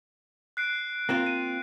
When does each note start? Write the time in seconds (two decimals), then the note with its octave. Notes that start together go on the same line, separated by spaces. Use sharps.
0.57 F#6 C7 D7
1.09 A#3 C4 F4
1.27 D#7